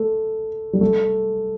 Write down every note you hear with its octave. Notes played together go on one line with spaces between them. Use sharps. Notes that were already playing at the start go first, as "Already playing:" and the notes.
Already playing: A3
G3
A3